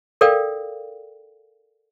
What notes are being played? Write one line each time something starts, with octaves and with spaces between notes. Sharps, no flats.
A4 A#4 D5 F5 G5